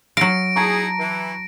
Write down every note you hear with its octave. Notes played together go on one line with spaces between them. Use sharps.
F#3 F5 A#6 D7
D#4 E4 G#4 A5 A#5 C#6
E3